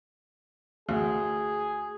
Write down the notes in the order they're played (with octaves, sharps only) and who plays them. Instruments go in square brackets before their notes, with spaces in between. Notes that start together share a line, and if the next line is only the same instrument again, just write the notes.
[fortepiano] D2 [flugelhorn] G#4